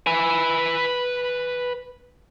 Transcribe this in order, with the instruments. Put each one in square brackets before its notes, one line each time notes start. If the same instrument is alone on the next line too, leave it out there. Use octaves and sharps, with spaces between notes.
[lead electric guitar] B4 G#5